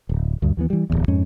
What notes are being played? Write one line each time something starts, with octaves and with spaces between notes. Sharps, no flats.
D1
D2 G2
D#2 E3 B3
E3 G3
D1 B1 E2
F2 G#2 C#4